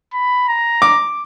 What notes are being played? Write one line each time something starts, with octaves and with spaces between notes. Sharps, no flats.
B5
A#5
D6